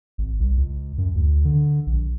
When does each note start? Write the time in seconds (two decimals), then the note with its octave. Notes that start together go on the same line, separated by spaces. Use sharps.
0.18 G#1
0.40 C2
0.57 C#2
0.98 F#2
1.15 D2
1.45 D3
1.87 A#1